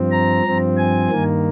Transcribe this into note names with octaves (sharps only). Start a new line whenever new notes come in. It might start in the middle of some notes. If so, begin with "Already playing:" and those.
Already playing: G2 F3 C4
A#5
G2 F3 C4
G#5
G2 D#3 A#3